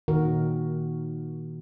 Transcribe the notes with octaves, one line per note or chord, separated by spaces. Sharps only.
A#2 D#3 F#4 A#4